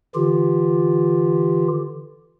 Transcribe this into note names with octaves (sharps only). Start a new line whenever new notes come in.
D3 E3 F4 G4